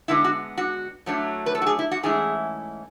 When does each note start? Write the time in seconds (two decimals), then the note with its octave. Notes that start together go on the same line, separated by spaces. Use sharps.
0.08 D3 G#3 B3 D4 E4
0.24 F#4
0.58 F#4
1.06 A2 F#3 A3 D4
1.46 B4
1.55 A4
1.62 F#4
1.66 G#4
1.79 E4
1.91 F#4
2.03 G#2 E3 A3 C#4 E4 G#4